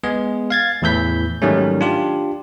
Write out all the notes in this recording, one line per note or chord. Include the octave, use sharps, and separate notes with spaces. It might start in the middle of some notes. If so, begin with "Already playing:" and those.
G#3 B3 G#4
F5 G#6 A6
E2 A2 E3 B4 G6 B6
G#2 D#3 F#3 G3 A3 C#4
D4 F4 G4